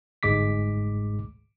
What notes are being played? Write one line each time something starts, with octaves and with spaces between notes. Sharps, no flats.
G1 G#2 G#3 D6 B6